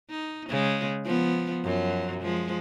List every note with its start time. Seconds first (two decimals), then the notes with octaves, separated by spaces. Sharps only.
0.11 D#4
0.49 C#3 G#3
1.05 F3 B3
1.64 F#2 F3 F#3
2.21 F3 G#3